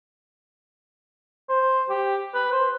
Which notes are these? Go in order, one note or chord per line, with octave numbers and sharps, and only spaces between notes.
C5
G4
B4
C5